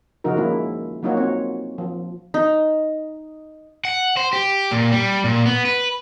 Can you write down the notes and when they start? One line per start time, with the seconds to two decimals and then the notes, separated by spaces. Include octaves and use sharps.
0.24 C#3 F3 D#4 F#4 A#4
0.36 D#3 G#3 A#3 C#4 E4 F4
1.03 F#3 A#3 D#4 F4 F#4 C#5
1.17 C4 C#5
1.78 F3
2.34 D#4
3.85 F#5
4.17 C5
4.33 G4
4.71 A#2
4.92 G3
5.24 A#2
5.46 B3
5.65 B4